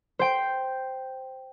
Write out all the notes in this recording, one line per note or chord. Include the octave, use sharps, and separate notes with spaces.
C5 G5